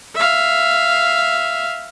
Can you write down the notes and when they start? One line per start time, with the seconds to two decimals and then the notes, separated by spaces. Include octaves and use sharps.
0.15 E5 F5